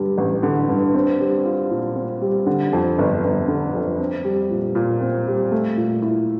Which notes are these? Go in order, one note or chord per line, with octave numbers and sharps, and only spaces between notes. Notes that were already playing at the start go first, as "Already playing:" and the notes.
Already playing: G2 D3 G3
A1
D3
G2
C4
G3
F4
A#2
C4
G3
D3
F2
G1
G1
D3
F2
C4
G3
A#2
A#2
C4
G3
A3
A#2
E4